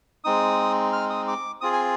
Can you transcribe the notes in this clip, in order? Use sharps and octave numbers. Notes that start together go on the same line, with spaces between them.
G#3 C4 D#4 D#6
F6
D#6
D6
C4 F4 G#4 D#6
G#5